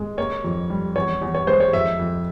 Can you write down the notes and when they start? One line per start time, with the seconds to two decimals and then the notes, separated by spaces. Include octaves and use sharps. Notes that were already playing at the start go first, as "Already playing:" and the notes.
Already playing: G#3
0.17 A#3 C#5
0.44 F2
0.70 G3
0.96 E2 C#5
1.21 E2
1.35 C#5
1.47 G#3 C5
1.60 C#5
1.73 F2 E5
1.99 F2